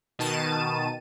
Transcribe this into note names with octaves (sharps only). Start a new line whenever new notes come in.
B2 D#3 A5 D#7